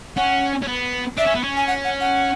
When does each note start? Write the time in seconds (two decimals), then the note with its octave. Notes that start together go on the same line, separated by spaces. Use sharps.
0.17 C#4 F#5
0.62 C#4
0.67 B3
1.17 D4 E5
1.26 C#4
1.35 B3
1.44 C#4
1.57 G#5
1.67 F#5
1.84 F#5
2.01 F#5